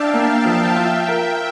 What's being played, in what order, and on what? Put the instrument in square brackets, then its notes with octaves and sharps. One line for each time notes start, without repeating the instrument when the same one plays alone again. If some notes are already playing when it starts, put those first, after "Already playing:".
Already playing: [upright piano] D4 [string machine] E5 F5 G5 A5
[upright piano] A#3 [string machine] F5 A5
[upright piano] F3 [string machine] F5 A5
[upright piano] F4 [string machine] E5 G5
[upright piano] A#4